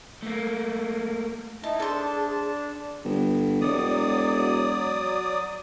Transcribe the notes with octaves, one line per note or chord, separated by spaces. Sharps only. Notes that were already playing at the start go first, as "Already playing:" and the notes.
A3 A#3
D#4 E4 A5
D4 G#4 A4 C5 A5
G1
E1 F#3 D5 D#6